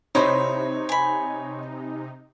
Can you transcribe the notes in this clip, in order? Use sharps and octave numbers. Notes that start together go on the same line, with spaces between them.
C3 D#4 E4 C5 C#5 C6
G#5 B5